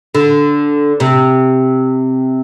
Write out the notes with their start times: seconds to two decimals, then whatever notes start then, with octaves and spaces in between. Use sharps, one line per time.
0.15 D3
1.00 C3